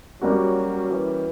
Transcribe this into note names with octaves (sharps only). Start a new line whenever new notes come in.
F#3 G3 A#3 C#4 F#4
E3